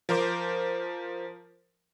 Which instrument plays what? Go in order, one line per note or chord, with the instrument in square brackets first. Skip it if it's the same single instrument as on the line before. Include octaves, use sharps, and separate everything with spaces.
[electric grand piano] F3 A#4 C5 D6